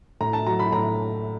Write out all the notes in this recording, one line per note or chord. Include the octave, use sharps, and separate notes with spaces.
A2 A#5
A5
F#3 A#5
B5
A2 A#5